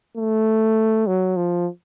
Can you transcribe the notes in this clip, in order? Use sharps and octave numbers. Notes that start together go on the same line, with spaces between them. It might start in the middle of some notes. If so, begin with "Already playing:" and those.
A3
F#3
F3